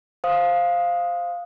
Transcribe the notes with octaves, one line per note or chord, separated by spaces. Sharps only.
C5 F5 D#6